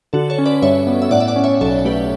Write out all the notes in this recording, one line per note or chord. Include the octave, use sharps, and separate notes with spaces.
D3 F#4 A4
A4 C#5
C#4
B4 D5
G2 C#5 E5
B3
E5
A2 D5 F#5
E5
D5 F#5
C#4
C#5 E5
B1 A4 C#5
A3 G4 B4